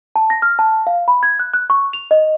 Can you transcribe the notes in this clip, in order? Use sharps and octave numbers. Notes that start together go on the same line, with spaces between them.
A5
A#6
F6
A5
F5
B5
G#6
F#6
F#6
C#6
F7
D#5